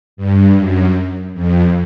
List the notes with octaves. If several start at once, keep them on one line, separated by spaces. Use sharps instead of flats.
G2
F#2
F2